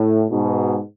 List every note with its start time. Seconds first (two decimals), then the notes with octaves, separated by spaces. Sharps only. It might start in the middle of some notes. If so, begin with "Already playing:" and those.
Already playing: A2
0.30 G#2 B2